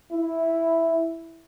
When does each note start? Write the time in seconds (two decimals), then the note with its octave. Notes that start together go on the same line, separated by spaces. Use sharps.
0.12 E4